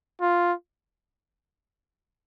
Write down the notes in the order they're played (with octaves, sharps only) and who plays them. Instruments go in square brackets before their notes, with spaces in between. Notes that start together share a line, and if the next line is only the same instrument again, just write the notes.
[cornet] F4